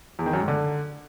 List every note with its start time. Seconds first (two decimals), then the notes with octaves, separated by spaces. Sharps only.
0.19 E2
0.26 D#3
0.33 F#2
0.41 G#2
0.48 D3